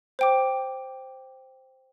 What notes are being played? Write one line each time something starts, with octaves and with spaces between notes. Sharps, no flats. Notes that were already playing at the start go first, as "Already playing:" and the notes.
C5 G5 D6